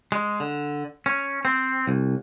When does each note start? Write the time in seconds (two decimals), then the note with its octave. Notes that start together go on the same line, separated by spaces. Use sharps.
0.12 G#3
0.40 D3
1.06 C#4
1.45 C4
1.87 C2